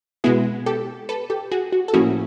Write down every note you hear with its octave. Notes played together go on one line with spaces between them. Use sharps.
B2 G#3 B3 E4 F#4 G#4
G4 A4
A4 B4
G4 A4
F#4 G#4
F#4
A4
A2 F3 A#3 C#4 E4 F#4 G#4